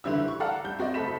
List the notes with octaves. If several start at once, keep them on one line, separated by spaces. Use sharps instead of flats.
F#1 D3 E3 G3 E4 E6
C#6
A4 D5 F5 F#5 A5 A#5
G3 G6
C4 F#4 D5 D#5
F#1 A3 A4 B5 B6 E7